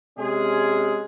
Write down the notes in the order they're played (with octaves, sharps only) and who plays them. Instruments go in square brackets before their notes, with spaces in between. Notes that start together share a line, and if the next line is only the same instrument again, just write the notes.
[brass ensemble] C3 G#3 C#4 G#4